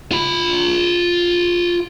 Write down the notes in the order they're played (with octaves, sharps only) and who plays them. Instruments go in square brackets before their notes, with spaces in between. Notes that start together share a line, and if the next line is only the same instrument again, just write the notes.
[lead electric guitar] F4 B5